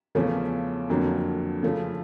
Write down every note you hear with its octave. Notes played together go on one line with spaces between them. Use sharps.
E2 C#3 F3 A3 C#4
F2 D3 F#3 A#3
C#3 F3 A3